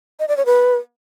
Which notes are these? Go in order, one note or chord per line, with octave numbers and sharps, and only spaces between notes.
D#5
D5
C#5
B4